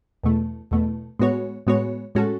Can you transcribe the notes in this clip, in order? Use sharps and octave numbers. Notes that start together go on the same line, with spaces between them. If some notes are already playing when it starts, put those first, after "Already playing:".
E2 B2 A3
E2 B2 A3
A2 G#3 B3 F#4 C#5
A2 G#3 B3 F#4 C#5
A2 G#3 C#4 F#4 A4